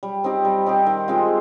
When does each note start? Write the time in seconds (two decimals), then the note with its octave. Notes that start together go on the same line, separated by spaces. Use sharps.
0.03 G3
0.24 C4 D#4 G4
0.45 G3
0.66 C4 D#4 G4
0.86 D#3
1.08 G#3 C4 F4